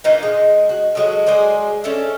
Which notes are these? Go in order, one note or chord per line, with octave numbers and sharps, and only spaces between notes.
A#2 E3 D#4
G#3
F#4
F#3 G#3 F#4 A4
G#3 G#4 C5 D5
C#4 A4 D5 E5